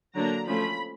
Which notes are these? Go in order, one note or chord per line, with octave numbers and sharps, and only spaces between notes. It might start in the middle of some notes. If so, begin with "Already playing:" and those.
D3 F#3 A#3 D4 A#5
F3 A3 C#4 B5